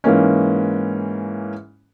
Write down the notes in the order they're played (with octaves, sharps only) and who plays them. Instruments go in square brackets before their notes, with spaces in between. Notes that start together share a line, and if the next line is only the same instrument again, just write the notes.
[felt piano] G#2 E3 A#3 C#4